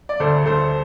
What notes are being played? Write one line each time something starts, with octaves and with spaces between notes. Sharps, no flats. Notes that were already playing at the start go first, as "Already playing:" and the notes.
D5
D2 A4 C5
D2 A4 C5